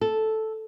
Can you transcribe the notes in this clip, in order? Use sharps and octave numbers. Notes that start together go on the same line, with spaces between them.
A4